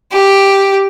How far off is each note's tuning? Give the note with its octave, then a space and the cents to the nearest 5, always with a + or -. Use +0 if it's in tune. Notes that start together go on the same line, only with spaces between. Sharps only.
G4 +0